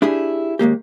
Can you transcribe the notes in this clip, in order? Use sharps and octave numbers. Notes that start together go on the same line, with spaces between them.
D4 E4 G4 G#4
D#2 G#3 A#3 G4